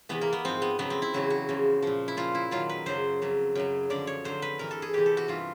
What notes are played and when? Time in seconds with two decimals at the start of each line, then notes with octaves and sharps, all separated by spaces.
0.09 E2 C3 E3 B3
0.21 A#3
0.33 B3
0.45 G#2 F3 C4
0.62 B3
0.79 F2 C#3 F#3 B3
0.90 C4
1.02 E4
1.14 E2 C#3 F#3 F#4
1.30 F#4
1.49 E2 C#3 F3
1.82 A#2 F3
2.08 E4
2.17 A#2 F3 F4
2.35 E4
2.51 F#2 D#3 F#3 F4
2.69 B4
2.86 F#2 C#3 F#3 C5
3.22 F2 C#3 F#3
3.55 F#2 C#3 F#3
3.90 F#2 D3 F3 D5
4.07 C#5
4.24 F2 D3 F#3 C5
4.42 B4
4.59 G2 E3 A#4
4.71 A4
4.82 G#4
4.93 E2 C3 E3 G4
5.06 A4
5.17 F#4
5.28 G2 E3 F4